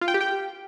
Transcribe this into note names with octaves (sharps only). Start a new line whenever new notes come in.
F4
G5
G4
G5